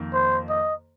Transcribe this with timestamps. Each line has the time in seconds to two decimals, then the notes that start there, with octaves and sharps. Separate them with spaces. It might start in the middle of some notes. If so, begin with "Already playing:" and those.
Already playing: F2 D#3 A#3
0.14 C5
0.49 D#5